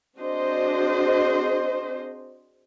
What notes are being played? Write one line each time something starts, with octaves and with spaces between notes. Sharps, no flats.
C4 D4 F#4 G#4 C5 D#5